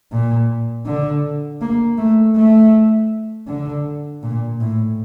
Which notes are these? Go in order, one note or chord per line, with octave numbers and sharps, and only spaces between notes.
A#2
D3
A#3
A3
A3
D3
A#2
A2